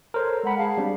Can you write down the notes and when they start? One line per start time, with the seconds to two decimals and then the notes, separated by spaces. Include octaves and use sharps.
0.14 A4 A#4 C5 C#5
0.44 G#3 F#5 A#5 B5
0.57 G#4 F5 A5
0.78 G3 C4 D4